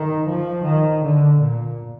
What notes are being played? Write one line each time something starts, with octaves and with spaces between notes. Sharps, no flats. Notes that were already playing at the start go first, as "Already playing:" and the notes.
Already playing: D#3
F3
D#3
D3
A#2